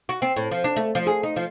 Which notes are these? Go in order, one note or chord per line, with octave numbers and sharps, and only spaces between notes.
F#4
C4
A2
F3
D4
A3
F3
G#4
D#4
F3